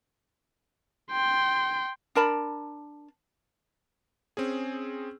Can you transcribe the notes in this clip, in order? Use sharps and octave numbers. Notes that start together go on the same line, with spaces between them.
G5 C6
D4 A#4 A5 B5
C4 C#4 G#4